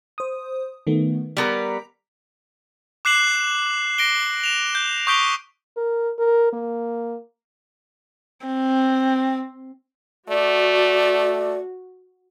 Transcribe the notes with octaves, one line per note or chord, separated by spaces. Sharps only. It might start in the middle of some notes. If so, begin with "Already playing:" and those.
C5 D#6
D#3 A3 B3
G3 B3 A#4 A#5 B6
D6 F#6 C7 E7 F#7
A#6 D7 G7
E7 F7
G6
C#6 D#6 G6 B6 D7 G7
A#4
A#4
A#3
C4
A3 F#4 D5